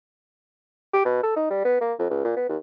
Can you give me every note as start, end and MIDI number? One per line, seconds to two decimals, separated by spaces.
0.93 1.00 67
1.05 1.22 47
1.23 1.34 69
1.36 1.46 63
1.50 1.62 55
1.65 1.80 59
1.81 1.93 58
1.99 2.06 41
2.10 2.21 37
2.25 2.33 46
2.36 2.48 59
2.49 2.57 39